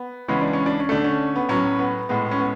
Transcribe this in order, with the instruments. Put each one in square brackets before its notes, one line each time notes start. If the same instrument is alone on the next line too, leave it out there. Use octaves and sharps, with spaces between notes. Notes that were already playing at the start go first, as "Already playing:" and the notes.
Already playing: [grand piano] B3
C#3 E3 G#3 B3 C#4
D4
C#4
D4
C#4
D3 A3 D4
C#4
B3
A2 F#3 B3 C#4
B3
A2 G#3 B3
C#4
B3